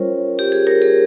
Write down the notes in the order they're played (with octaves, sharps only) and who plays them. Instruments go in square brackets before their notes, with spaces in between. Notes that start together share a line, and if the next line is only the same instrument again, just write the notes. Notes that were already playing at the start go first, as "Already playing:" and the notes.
Already playing: [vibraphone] G3 C#4 F4 A#4 C5 C#5
G4
G#4
A#4
G#4